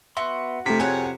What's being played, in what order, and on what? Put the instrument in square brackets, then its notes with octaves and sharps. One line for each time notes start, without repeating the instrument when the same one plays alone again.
[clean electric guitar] B3 C6 [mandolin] F#4 [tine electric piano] E5
[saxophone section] F2 C3 [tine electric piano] A3 B6 [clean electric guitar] D4 A#4
[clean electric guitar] C4 F#4 G#4 [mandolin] C#5 F#5 [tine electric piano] G#5